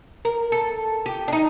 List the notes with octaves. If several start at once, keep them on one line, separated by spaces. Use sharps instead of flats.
A#4
A4
G4
D4
D#4